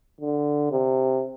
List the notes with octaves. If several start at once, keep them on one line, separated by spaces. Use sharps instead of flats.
D3
C3